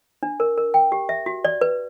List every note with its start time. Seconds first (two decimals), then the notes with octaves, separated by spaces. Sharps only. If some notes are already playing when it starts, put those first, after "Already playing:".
0.23 D4
0.40 A#4
0.58 A#4
0.74 G5
0.92 G4
1.09 E5
1.26 F#4
1.45 D5
1.61 B4